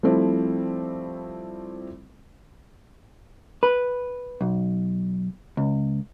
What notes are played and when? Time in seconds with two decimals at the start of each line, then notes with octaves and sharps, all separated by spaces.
0.03 F3 G3 A3 C4 E4
3.63 B4
4.41 B1
5.57 C#2